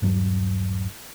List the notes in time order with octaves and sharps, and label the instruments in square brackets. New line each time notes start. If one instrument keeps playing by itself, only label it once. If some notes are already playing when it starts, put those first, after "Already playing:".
[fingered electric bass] D#1 G2 F#3